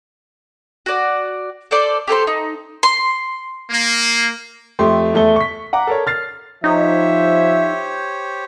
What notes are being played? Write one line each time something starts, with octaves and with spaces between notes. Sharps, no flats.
F#4 D5
A4 C5 D5 C6
G4 A4 C5 C6
D#4
C6
A#3
F2 A3 G4 C6
E2 A3 A4 G7
C#6 B6
F#5 A#5 D6
A4 A#4 C#5
F6 A6 C7
F3 D#4 G4 C5 C#5 E5